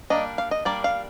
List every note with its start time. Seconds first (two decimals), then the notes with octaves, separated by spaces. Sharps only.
0.10 G3 A#3 D4 D#5
0.38 F5
0.51 D#5
0.65 G3 A#3 D4 D5
0.84 F5